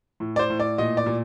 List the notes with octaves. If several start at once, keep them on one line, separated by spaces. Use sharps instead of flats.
A2
D5
C5
A2
D5
A#2 D#5
D5
A#2